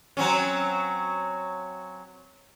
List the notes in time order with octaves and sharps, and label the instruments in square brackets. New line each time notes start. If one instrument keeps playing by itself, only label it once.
[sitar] F#3 C4 C#4